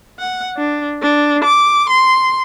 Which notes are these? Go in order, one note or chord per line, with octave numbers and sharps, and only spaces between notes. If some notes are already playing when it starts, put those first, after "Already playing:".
F#5
D4
D4
D6
C6